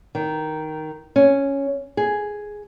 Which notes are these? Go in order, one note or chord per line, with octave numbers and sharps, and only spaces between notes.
D#3
C#4
G#4